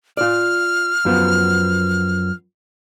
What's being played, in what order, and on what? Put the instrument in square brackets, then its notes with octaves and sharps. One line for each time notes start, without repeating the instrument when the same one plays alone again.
[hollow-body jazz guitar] F4 D5 [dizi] F6
[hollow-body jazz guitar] F#2 F3 B3